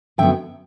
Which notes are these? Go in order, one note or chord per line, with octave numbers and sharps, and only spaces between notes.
F#2 D3 F#3 B3 E5 G5